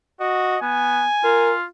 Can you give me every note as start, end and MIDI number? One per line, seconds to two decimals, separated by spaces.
0.20 0.56 66
0.20 0.59 75
0.62 1.04 59
0.62 1.55 80
1.24 1.64 65
1.24 1.53 70